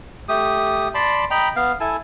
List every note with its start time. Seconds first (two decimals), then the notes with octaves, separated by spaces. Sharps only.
0.29 A3 G4 D#6
0.95 D5 A5 B5 C6
1.31 D#5 G5 A#5 B5
1.56 B3 F5
1.80 E4 A4 G#5 A5